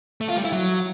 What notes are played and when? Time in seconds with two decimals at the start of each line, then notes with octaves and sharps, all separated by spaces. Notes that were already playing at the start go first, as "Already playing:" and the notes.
0.21 A3
0.29 F4
0.36 G3
0.44 E4
0.52 F#3